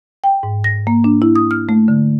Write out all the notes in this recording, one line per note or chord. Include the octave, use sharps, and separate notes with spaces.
G5
G#2
A#6
A#3
D4
E4
D#6
F6
A3
D3